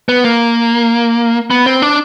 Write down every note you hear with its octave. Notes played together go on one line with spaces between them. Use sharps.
B3
A#3
B3
C4
D4